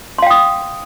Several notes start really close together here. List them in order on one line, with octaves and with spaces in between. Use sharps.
C6 F5 G5 D#6